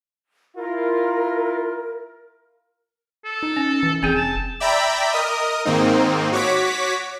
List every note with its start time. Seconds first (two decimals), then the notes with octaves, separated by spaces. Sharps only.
0.57 E4 F4 A#4
3.25 A4
3.43 D#4
3.56 C#4
3.83 E3
4.03 F1 C4 G#4 G5
4.15 A5
4.60 D5 E5 G5 A#5 B5
5.12 A#4 D#5 D#6
5.65 G#2 D#3 A#3 C4 D#4
6.32 F#4 C#5 D6 B6